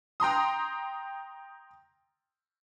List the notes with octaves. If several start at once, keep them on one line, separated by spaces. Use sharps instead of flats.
G5 A#5 C6 D#6